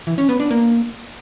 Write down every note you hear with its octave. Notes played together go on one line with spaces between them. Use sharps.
E3
C#4
B3
D4
A#3